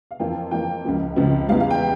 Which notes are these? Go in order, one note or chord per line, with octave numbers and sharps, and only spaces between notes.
F5
F2 E3 A#3 F4 G5
F2 E3 A#3 F4 G5
C#2 C#3 F3
C#2 C#3 F3
E2 E3 G3 F5
F5
G5